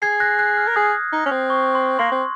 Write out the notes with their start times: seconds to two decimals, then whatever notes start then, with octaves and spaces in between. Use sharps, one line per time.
0.02 G#4 G#6 C7
0.20 F#6 A#6
0.39 F#6
0.57 F6
0.67 A#4
0.76 G#4 D#6
1.13 D#4
1.26 C#4
1.31 C4
1.50 C#6
1.75 C6
1.99 A#3 C6
2.12 C4